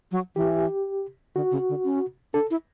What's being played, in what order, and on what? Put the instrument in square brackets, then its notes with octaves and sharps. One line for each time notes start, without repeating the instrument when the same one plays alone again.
[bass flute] F#3
[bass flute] E3 [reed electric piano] G4
[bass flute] D3 [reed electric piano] F#4
[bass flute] C#3
D3
C#4
[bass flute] D4 [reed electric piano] A4
[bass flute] E4